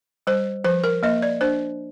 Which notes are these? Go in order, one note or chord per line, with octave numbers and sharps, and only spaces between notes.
G3 C5
F3 C5
A#4
A#3 D#5
D5
D4 C5